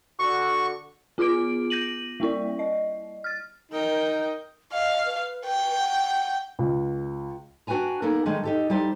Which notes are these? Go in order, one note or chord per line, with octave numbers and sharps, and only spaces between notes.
D3 F#4 C#6
B3 F4 G#4 D6 D7
G6 A#6 D#7 F#7
G3 A#3 E4 D5
D#5
F6 A6
D#4 A#4 G5
D#5 F5
B4
B4 G5
F#5
C#2
D4 F#4 B4 G5 G#5 A#5
A#3 B3 D#4 A4 A#4
D3 D#3 G#3 A3 D#4
D#4 G4 A4
G3 D#4 E4 G4 C5 A5